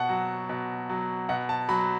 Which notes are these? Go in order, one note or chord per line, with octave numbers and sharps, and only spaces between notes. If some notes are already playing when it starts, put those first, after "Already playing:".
Already playing: B2 F#5 A5
F#3
B2
F#3
B2 F#5
A5
F#3 B5